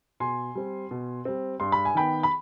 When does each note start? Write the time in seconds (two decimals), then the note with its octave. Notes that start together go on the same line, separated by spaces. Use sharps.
0.20 B2 G#5 C6
0.55 G3 C4
0.91 B2
1.25 G3 C4
1.60 G2 C6
1.72 B5
1.85 G#5
1.95 D#3 B3 G5 B5
2.23 B5